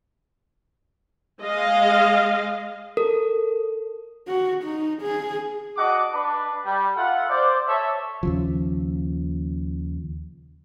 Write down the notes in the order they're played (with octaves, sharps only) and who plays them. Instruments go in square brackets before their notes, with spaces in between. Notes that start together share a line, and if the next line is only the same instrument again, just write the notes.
[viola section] G#3 D#5 F5
[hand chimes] A4 [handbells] A#4
[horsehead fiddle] F#4
D#4
G#4
[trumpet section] D4 F#4 D#5 F#5 D6
D4 B4
G3
F4 A4 E5 F#5
C5 D5
A4 C#5 E5
[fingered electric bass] D#2 C#3 F3